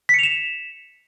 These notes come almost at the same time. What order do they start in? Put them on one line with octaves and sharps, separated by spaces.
B6 C#7 F7 E7